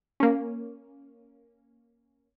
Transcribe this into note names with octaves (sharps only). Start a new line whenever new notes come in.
A#3 C#4